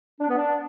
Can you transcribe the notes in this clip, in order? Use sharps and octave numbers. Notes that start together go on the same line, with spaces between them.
D4
B3
D4